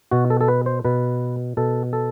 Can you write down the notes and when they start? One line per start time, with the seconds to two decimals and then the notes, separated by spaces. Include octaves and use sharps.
0.11 B2 F#4
0.30 A4
0.41 A4
0.48 B4
0.66 C5
0.85 B2 B4
1.57 B2 A4
1.93 A4